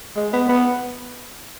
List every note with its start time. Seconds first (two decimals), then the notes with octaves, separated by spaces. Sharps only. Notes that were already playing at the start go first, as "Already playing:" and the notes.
0.16 G#3
0.33 B3
0.49 B3